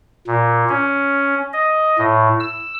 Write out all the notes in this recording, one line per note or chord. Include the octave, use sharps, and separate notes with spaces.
A#2
C#4
D#5
A2
E6